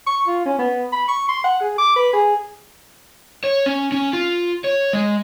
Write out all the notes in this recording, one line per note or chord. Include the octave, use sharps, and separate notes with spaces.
C#6
F4
C#4
B3
B5
C#6
C6
F#5
G#4
D6
B4
G#4
C#5
C#4
C#4
F4
C#5
G#3